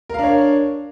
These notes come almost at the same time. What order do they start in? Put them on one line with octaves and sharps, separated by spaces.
A#4 F5 D4 C#5